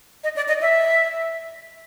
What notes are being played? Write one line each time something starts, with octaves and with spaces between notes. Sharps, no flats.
D#5
D5
D#5
E5